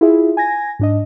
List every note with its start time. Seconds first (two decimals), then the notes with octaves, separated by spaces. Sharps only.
0.01 E4 F4 G#4 E5
0.37 G#5 G#6 A#6
0.79 G#2 D4 D#5